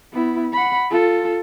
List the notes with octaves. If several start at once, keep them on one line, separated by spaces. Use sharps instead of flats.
B3 E4
F#5 B5
F4 A4